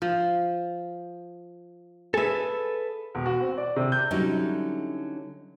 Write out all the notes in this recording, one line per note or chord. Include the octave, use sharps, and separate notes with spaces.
F3
G#4 A4 B4 E5
E1
F#4
C4
D5
C3
G6
D3 F#3 G3 C#4 D#4 E4